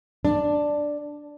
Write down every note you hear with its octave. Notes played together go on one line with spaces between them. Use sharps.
D4